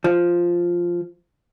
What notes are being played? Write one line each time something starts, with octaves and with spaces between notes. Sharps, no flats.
F3